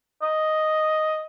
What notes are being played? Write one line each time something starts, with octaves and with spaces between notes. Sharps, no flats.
D#5